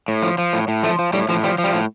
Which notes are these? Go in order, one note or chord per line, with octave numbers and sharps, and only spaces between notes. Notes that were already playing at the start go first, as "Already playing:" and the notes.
A2
F3
F3
A2
A2
F3 A3
F3
A2 G3
A2 F3
F3 G3
F3
G3
A2